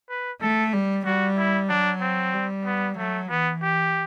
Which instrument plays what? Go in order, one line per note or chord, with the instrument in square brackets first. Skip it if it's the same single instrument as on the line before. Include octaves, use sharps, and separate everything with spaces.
[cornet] B4
[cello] A3 [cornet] A4
[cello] G3
[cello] G3 [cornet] F#4
[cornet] E4
[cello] F#3 [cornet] D4
[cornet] C4
[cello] G3
[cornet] B3
[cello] F#3 [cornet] A3
[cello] E3 [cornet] B3
[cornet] G4